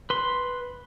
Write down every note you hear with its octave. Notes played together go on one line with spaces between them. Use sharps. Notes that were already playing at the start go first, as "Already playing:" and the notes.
B4 C6